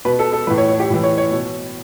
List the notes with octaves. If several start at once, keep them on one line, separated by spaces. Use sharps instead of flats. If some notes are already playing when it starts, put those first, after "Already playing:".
B2 B4
A4
A4
A2 E3 B4
C#5
C#5
G4
A2 E3
C#5
C#5
B2